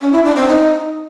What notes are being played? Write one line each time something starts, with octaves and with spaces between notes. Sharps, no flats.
C#4
E4
D4
C4
D#4